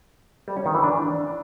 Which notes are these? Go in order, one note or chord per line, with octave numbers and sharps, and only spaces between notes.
G3
C#4
D#3
E3
D4